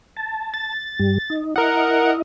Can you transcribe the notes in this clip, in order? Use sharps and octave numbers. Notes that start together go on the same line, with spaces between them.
A5
A6
G2 G3
D#4
E4 A#4 D#5 F#5